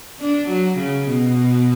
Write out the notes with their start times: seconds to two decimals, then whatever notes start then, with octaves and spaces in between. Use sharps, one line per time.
0.20 D4
0.48 F#3
0.78 C#3
1.09 B2